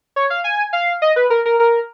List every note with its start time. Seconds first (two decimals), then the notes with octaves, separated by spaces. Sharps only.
0.16 C#5
0.30 F5
0.44 G#5
0.73 F5
1.02 D#5
1.16 B4
1.30 A#4
1.46 A#4
1.60 A#4